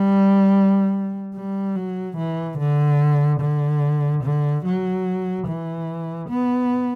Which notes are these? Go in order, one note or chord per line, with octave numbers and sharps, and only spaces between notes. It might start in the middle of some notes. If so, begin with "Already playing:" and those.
Already playing: G3
G3
F#3
E3
D3
D3
D3
F#3
E3
B3